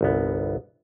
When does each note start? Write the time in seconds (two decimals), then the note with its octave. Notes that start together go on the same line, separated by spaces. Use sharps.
0.01 G1 C2 B3